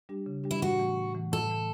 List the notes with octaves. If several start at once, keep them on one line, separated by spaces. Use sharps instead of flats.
G3 D4 G4
C#3
G3 D4 G4
E4
A2 F#4
E3 A3
A2
E3 A3
A2 A4
E3 A3